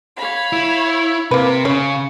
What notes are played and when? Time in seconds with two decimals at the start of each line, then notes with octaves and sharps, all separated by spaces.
0.18 C#5 F5 B5
0.53 E4
1.31 C3 A#3 B4 B5
1.65 C#3 C#4 C#5